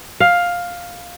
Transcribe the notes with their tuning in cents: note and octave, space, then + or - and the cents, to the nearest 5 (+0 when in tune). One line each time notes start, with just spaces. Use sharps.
F5 +10